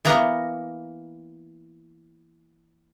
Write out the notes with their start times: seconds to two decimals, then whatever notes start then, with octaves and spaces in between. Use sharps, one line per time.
0.05 E3 A#3 B3 A#5